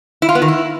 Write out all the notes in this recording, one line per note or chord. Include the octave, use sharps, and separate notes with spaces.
E4
F4
B3
D#3
E4